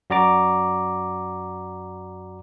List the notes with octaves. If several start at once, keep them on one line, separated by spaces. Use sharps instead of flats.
F#2 F#4 D5 A#5 D6